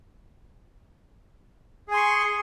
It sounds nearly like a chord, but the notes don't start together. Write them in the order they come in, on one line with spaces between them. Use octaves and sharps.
G#4 G#5 C6 C#6